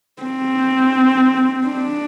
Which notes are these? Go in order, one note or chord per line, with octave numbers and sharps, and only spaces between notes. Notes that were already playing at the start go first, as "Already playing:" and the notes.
C4
D4